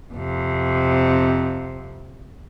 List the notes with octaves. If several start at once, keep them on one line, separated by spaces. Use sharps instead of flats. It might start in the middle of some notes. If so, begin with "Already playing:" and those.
F2 C3